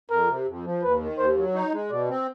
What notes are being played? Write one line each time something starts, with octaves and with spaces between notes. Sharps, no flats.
F2 A#4
C3
F2
F3
D#2 B4
D#3
D#2 C5
F#3
D#4 C#5
G#3
B2 D5
C4